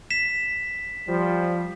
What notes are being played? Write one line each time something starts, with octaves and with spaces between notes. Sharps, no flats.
B6 E7
F3 G3